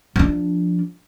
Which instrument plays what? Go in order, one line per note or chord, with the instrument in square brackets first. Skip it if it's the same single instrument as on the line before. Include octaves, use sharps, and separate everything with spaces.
[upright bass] F3 D4